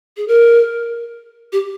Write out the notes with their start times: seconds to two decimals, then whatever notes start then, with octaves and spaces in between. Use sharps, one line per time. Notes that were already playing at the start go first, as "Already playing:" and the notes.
0.17 G#4
0.28 A#4
1.52 G4